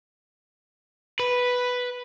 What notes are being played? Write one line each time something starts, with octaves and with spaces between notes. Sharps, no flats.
B4